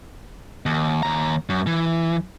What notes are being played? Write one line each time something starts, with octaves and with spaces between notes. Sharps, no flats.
D#2
D#2 A#5
F#2
E3